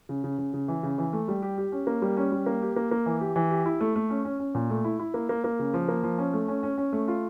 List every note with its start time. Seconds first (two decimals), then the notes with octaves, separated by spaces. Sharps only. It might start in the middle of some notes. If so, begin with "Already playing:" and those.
0.09 C#3
0.24 C#3
0.38 C#3
0.53 C#3
0.68 E3
0.83 C#3
0.98 E3
1.13 A3
1.28 G3
1.42 G4
1.58 G4
1.72 C#4
1.87 A#3
2.02 G3
2.17 C#4
2.32 G3
2.46 A#3
2.62 G4
2.76 A#3
2.91 A#3
3.06 E3
3.21 G4
3.36 E3
3.51 G4
3.66 E4
3.80 A3
3.96 A3
4.10 C#4
4.25 C#4
4.40 C#4
4.55 A#2
4.70 A3
4.84 E4
4.99 E4
5.14 A#3
5.29 A#3
5.44 A#3
5.59 C#3
5.74 F3
5.88 A#3
6.03 F3
6.18 C#4
6.33 A3
6.48 C#4
6.63 C#4
6.78 C#4
6.93 A3
7.08 F4